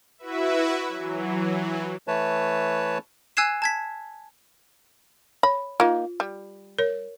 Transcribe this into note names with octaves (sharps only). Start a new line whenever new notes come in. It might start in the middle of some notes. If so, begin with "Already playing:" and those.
E4 F#4 B4 E5
E3 F#3
E3 A3 B4 C#5 A5
G#5 E6 F#6 G#6 C7 E7
A5 G#6 B6
C#5 B5
A#3 D#4 F4
G3
A#4 C#5